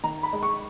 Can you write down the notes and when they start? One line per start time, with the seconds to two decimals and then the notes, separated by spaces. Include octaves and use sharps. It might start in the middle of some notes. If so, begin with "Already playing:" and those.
0.04 D#3 A#5
0.23 B5
0.33 G#3
0.43 C#6